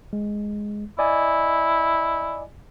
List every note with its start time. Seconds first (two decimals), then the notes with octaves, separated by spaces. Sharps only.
0.13 G#3
0.99 E4 D5 D#5 G#5